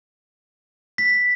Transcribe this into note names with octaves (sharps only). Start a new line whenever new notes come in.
B6